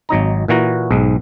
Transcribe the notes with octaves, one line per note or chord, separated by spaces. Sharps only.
G#1 F#3 D#4 A#5
A#2 E3 F#4 A#5
B1 G#2